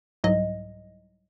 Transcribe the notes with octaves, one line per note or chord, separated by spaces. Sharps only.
C2 G#2 F#3 D#5